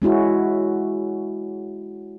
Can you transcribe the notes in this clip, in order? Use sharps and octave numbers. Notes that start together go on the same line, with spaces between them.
G#3 C#4 E4 F#4